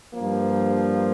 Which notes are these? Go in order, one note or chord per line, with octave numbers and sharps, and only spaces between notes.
G2 F3 A#3